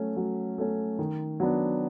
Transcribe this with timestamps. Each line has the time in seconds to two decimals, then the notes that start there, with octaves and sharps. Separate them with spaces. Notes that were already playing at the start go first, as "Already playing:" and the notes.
Already playing: F#3 A3 C#4
0.17 F#3
0.58 A3 C#4
0.99 D#3
1.40 F#3 B3 D4